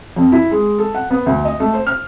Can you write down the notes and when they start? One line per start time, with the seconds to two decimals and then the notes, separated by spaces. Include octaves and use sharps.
0.16 F2
0.32 E4
0.51 G#3
0.78 A4
0.95 F#5
1.10 B3
1.26 D2
1.45 D#5
1.60 A3
1.74 C5
1.87 F6